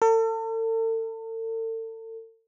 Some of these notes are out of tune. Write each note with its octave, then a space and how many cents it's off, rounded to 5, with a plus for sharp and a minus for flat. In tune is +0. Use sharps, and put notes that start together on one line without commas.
A4 +40